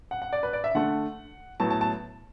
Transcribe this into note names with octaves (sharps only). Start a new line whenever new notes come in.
F#5
F#5
D5
B4
D5
E5
D3 A3 F#5
A2 F#3 B3 A5
A5
A5